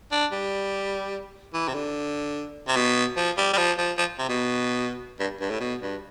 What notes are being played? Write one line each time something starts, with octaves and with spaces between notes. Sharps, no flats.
D4
G3
E3
C3
D3
C3
B2
F3
G3
G3
F3
F3
F3
C3
B2
G2
G2
A2
B2
G2